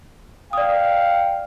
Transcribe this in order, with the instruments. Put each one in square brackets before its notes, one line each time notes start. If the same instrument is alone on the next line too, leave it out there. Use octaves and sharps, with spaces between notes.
[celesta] D5 D#6 [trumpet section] F5 G5